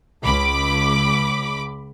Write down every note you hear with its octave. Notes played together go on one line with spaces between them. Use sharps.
C#2 B5 D6